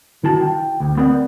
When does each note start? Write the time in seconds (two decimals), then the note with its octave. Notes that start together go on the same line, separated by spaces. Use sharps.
0.24 D#3 E4 F#4 A5
0.41 G5
0.80 D2
0.97 A3 B3 C4 A#4 B4 D5